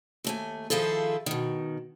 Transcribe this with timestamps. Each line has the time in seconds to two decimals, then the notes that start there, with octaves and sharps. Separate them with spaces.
0.24 D#2 A3 G#5
0.70 D#3 F3 E4 F4 G#4 A4
1.26 B2 D#3